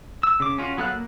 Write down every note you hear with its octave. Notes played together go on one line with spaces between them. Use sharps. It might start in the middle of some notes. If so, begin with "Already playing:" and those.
E6
C#3 D6
C#4 F4 F#4
F#3 B3 A4 F5 F#6
A#3